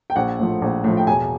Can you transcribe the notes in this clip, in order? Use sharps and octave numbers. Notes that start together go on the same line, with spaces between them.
G5
A#1 F#5
A2 F3
A#1
A2 F3
G5
E1 G#5